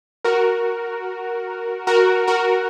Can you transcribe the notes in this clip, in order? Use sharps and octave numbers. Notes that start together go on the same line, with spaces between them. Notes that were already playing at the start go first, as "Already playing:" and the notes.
F#4 A#4
F#4 A#4
F#4 A#4